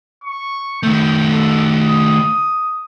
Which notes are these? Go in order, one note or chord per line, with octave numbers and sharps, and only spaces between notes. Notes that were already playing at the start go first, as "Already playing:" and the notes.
C#6
D#3 A3 G6
A4
D#6